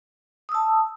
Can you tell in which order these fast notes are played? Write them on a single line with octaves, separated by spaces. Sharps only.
D#6 E6 A5